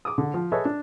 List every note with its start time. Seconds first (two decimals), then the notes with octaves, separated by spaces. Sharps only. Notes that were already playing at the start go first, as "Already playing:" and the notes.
0.05 D6 D#6
0.18 D3
0.34 F3
0.52 G#4 A4 B4 C#5 D#5 E5
0.65 D4